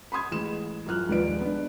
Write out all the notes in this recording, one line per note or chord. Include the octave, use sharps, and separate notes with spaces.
B5 C6 D#6 G#6
A1 G#3 E7
F#2 F3 F6 F#6
D#1 G#2 F3 B4 D5 D7
B3 D4